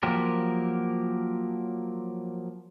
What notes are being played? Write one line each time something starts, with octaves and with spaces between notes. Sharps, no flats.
F3 F#3 A#3 G4 A#4